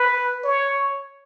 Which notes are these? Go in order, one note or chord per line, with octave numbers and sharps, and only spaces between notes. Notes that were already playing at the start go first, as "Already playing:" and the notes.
Already playing: B4
C#5